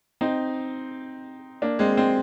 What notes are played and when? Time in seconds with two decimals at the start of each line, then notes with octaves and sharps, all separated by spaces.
0.21 C4 D#4
1.62 A#3 D4
1.79 G#3 C4
1.97 G#3 C4